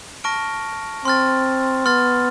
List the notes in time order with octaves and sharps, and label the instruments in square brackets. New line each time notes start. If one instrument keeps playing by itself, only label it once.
[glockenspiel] A5 C#6 F6 A#6 D7
[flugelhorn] C4 [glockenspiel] C6 F6 A6
[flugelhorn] B3 [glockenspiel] C6 F6 A6